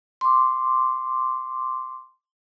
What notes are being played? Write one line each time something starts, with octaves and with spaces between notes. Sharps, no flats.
C6 D6